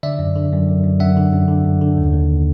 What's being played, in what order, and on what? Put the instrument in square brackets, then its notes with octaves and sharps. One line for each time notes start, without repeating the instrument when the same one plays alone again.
[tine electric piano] D3 D5 E5
F#2
D3
F#2
F#2
F#2
F#2 E5 F#5
D3
F#2
D3
F#2
D3
D#2
D#2